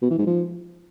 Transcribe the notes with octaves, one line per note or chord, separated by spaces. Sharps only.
B2
E3
G#2
F3